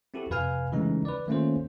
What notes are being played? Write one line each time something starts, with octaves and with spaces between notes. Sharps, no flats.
C4 E4 F#4 G4 A4
F2 C3 B4 F5 G#5 F6
C#3 E3 G#3 A3 C#4 D#4
B4 D5
D#3 A3 A#3 C#4 F4 C5